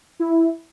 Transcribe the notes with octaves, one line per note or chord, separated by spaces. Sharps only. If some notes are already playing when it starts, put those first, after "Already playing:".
E4